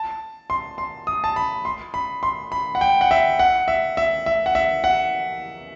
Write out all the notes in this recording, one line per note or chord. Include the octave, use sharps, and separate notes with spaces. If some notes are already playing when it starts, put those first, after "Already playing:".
Already playing: A5
C6
C6
D#6
A5
B5
C6
B5
C6
B5
F#5
G5
F#5
E5
F#5
E5
E5
E5
F#5
E5
F#5